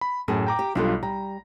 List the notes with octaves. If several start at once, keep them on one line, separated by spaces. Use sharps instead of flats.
B5
F#2 A2 G#4 A5
G5 A#5 D6
G4
B1 G3 D4 F4 A4
G3 A#5